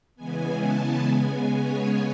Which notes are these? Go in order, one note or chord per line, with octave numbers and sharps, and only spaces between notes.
C#3 E3 G#3 B3 G#5
A5
C#3 G#3 B3 G#5
C#5